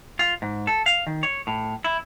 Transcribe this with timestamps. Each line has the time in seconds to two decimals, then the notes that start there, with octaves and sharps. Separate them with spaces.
0.19 F4
0.42 G#2
0.67 A4
0.86 F5
1.07 D#3
1.23 C#5
1.47 A2
1.84 E4